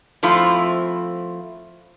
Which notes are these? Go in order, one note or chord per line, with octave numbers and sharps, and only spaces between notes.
F3 A3 C4 E4 F4